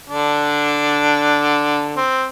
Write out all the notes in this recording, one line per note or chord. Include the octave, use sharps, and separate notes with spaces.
D3 D4
C4